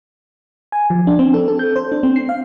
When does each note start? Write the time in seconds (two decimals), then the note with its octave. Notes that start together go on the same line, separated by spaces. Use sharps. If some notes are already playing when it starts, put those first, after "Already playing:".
0.72 G#5
0.90 F3
1.07 D4
1.19 C4
1.34 A4
1.48 A4
1.59 G6
1.76 C5
1.92 D4
2.03 C4
2.16 C7
2.29 F5